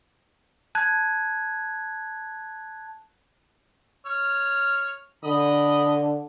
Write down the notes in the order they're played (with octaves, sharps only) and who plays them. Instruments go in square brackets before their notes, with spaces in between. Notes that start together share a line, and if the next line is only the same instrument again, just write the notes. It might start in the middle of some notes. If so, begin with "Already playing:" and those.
[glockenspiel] A5 F#6 G#6
[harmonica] C#5 F6
[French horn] D3 [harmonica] D#5 B5 D#6